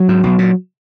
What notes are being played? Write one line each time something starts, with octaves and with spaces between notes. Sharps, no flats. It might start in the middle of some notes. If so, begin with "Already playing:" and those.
Already playing: F#3
G#2
B1
A#2